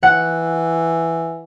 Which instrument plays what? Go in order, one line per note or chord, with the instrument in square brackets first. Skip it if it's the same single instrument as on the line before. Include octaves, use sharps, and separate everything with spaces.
[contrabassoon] E3 [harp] F#5